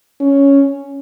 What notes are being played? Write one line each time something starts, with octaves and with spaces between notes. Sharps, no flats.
C#4